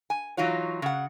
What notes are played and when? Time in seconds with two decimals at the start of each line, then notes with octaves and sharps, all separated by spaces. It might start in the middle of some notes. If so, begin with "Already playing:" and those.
0.10 G#5
0.37 E3 F#3 D#4 F4 C#5
0.82 C#3 F#5